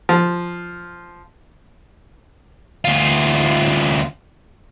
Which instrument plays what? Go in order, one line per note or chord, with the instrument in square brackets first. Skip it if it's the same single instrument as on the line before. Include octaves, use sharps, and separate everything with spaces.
[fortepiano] F3
[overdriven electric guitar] D2 F4